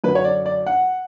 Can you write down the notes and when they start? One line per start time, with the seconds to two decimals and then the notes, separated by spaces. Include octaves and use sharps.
0.04 F#2 D3 F#3 B4
0.15 C#5
0.24 D5
0.46 D5
0.66 F#5